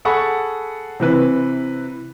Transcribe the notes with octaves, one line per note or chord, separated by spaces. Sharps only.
G#4 A4 F#5 B5 C#6
C3 E3 B4